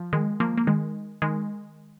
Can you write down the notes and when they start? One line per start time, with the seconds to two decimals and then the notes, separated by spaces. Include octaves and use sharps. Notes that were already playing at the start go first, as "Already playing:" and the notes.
Already playing: F3
0.13 D#3 G#3
0.40 F3 A#3
0.58 A#3
0.67 D#3 G#3
1.22 D#3 G#3